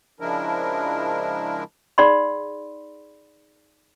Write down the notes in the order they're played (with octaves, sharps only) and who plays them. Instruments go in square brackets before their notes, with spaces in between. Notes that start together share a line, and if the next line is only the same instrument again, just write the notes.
[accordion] C#3 F3 G#3 D4 E4 A#4
[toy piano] D#4 G#4 D5 F#5 B5 C6